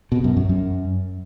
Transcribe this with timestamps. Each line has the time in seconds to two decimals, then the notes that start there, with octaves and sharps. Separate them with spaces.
0.12 B2
0.24 F#2
0.37 F#2
0.49 F#2